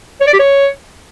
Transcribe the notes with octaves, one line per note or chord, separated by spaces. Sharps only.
C#5
D5
G4
C#5